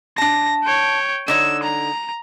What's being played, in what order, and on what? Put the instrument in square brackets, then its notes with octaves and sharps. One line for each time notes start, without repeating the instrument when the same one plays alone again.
[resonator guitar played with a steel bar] D4 A5 [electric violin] A#6
[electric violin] C#5 G5
[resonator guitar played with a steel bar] D3 D#4 C#5 [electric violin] E6
[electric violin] A#5